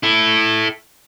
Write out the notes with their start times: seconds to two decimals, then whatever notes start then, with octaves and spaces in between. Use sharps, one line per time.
0.03 E4 A4